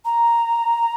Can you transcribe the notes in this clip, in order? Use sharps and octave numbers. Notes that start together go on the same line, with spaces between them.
A#5